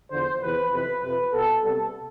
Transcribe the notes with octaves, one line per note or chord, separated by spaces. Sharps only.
E2 D3 F3 C5
E2 C3 E3 B4
F2 C3 E3 B4
F2 C3 F3 B4
B2 B3 A4
C3 G3 B3 A4